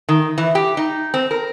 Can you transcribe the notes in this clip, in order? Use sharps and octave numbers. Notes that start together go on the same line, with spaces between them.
D#3
E3
G4
D#4
C4
A#4